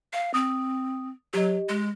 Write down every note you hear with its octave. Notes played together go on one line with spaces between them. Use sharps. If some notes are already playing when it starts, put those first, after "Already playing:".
F5
C4 D#6
F#3 G4 D#5
G#3